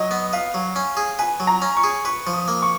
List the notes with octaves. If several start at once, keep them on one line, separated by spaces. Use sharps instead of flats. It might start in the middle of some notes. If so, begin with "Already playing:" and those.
Already playing: F#3 D#5
B3
B4 F5
F#3
C#4
G#4
B4 G#5
F#3
A#5
C#4
C#6
G#4
B4 C#6
F3
D#6
A#3
C#6